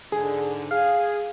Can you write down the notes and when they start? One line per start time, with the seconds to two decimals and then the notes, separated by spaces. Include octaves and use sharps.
0.12 G#2 D3 G#4
0.71 G#4 F5